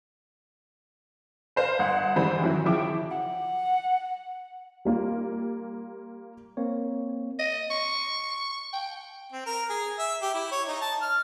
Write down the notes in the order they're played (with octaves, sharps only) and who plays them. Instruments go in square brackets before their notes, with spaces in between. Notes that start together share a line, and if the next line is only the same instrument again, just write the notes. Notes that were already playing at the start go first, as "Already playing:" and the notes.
[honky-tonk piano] B4 C5 F5
G1 F#5 C6
G#2 E3 G3 C5 B5
D#3 E3 F#3 E4
C#3 F3 E4 G5 D6
[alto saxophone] F#5
[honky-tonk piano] G3 A#3 F4
[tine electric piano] A#3 C4 C#5
[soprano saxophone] D#5
C#6
G5
[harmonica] C4
A#4
G#4
E5
G4
E4
C#5
D#4
A5
F6